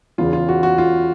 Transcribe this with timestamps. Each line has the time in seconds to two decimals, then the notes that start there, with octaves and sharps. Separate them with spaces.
0.18 E2 C#3 E3 F4
0.33 F4
0.49 F#4
0.63 F#4
0.78 F4